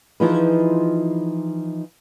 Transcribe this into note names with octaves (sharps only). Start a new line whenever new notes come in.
E3 F3 D#4 F4 G#4 B4